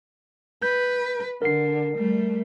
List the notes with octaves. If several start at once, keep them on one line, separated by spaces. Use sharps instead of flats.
B4 G6
D3 A#4 C7
G3 A3